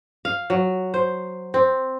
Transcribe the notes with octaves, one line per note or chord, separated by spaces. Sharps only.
F5
F#3
C5
C4